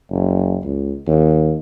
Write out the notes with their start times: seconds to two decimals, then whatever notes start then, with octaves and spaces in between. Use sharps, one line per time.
0.11 F#1
0.64 C#2
1.07 D#2